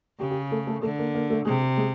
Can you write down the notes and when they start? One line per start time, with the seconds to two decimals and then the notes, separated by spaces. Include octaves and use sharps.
0.20 C#3 G4
0.31 G4
0.51 A3 A4
0.67 A3 A4
0.82 D3 A3 A4
0.99 A#3 A#4
1.15 A#3 A#4
1.30 A3 A4
1.45 C3 G#3 G#4
1.62 G4
1.77 G#3 G#4